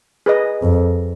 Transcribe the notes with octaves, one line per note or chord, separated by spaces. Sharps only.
G#4 B4 D#5
F2